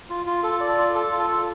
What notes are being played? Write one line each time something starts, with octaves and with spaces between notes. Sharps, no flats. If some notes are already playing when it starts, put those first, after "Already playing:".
F4
F4
A4
D5
F4
A4
F4
A4